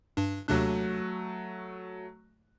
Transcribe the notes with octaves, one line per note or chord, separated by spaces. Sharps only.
G2 D4
D#2 C3 F#3 A3 D4 F#6